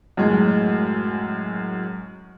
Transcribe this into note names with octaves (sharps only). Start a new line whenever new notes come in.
F#2 A2 G#3